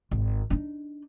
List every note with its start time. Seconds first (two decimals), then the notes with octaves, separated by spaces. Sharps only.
0.11 G#1
0.50 D4 D#4